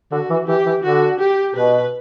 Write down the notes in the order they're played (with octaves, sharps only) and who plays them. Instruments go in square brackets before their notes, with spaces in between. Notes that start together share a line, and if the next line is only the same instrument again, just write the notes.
[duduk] D3 [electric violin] F#4
[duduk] E3
[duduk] E3 [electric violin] G4
[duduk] E3
[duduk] D3 [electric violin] F#4
[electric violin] G4
[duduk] B2 [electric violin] B4